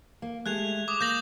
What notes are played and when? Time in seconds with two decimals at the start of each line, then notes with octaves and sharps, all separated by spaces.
0.22 A#3
0.46 G#3 A3 G4 F#6 G#6 F7
0.88 D6 D#6
1.01 A#3 G6 A#6 F#7